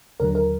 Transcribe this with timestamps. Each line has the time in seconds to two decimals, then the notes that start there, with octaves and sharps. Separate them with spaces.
0.20 D#2 D3 F#3 A#4
0.35 A#4